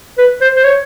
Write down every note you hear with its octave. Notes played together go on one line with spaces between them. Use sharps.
B4
C5
C5
C#5